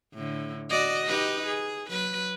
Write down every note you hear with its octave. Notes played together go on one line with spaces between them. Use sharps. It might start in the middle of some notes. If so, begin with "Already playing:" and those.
A2 D3
F#4 D5 D#5
D#4 G4 B4
G#4
F#3 B4